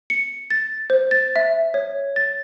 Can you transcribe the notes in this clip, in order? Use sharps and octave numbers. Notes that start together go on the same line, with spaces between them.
C#7
A6
C5
A6
E5
C#5
A6